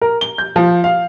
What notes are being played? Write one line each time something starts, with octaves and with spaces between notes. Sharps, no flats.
A#4
G7
G6
F3
F5